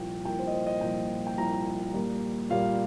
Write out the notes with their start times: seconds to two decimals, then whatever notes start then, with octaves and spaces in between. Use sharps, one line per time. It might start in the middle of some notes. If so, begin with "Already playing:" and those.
Already playing: C2 A#2 F3 A#3 G5
0.25 C2 A#2 F3 A#3 G5
0.39 C5
0.47 D#5
0.53 C5
0.67 D#5
0.81 C2 A#2 F3 A#3 G5
1.27 G5
1.38 C2 A#2 F3 A#3 A#5
1.94 A#2 G3 A#3
2.50 A#2 G3 A#3 F5